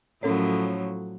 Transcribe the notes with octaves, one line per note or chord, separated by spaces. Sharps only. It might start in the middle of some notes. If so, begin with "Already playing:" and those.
A2 F3 F#3 C#4 A4 C#5